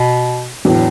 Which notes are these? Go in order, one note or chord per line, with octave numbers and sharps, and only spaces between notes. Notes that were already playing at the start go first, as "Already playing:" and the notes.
Already playing: B2
E2 A2 D3 F#3 B3 D4